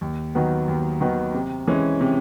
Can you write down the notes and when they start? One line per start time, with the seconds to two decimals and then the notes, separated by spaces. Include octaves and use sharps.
0.01 D#2
0.35 D#3 F#3 B3
0.68 D#2
1.01 D#3 F#3 B3
1.34 C3
1.68 E3 G#3 C#4
2.01 C3